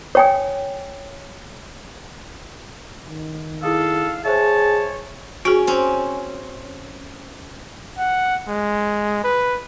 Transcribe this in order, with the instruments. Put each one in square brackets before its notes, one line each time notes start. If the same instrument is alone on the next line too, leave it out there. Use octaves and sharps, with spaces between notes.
[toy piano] C#5 G5 G#5
[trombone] D#3
[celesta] E4 G#4 D#6 [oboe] A4 [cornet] F5
[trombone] G#4 [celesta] C5 E5 [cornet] C#5 [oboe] A5
[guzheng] C#4 [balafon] F#4 G#4
[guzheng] C4 C#4
[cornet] F#5
G#3
B4